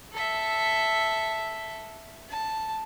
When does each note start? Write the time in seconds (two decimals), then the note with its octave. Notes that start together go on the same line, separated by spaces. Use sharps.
0.13 A4 E5
2.30 A5